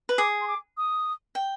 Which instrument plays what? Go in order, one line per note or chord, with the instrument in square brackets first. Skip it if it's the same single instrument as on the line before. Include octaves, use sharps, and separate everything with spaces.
[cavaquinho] B4
[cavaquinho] G#4 [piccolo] D6
[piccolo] C6
D6
D#6
[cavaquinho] G5